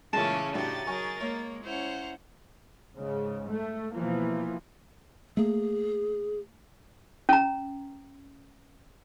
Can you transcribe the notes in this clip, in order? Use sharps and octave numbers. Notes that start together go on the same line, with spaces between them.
A#2 C#3 E3 G#3 A3 C#4 A5 E7
A2 D4 D#4 F#4 G4 C5 A6
F#3 G#4 A#4 G#5 C#6
G#3 A#3 C#5
C#4 E4 C5 F#5 A#5
G#2 C#3
A3
B2 E3 F3 A#3
A3 A#3 G#4
C#4 A#5